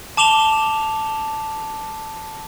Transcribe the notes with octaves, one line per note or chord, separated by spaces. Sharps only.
A5 D6 E7 F7 G7